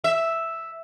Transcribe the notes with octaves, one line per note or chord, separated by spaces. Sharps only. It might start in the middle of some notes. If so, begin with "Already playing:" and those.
E5